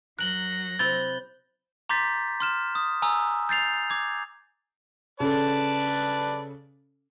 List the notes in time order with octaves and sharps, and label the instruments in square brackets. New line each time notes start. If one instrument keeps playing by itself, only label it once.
[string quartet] F#3 A#6 [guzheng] A#4 A#5 [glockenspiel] F#6 F#7 G7
[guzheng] C3 E4 [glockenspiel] B5 G6 G7 [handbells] A6
[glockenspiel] A#5 C6 D6 G6 A6 B6
C6 F6 E7
D#6
G#5 A#5 D#6 E6
G6 A6 C7 F7
D6 G#6
[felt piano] C#3 C#4 A4 [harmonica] B4 D5 A5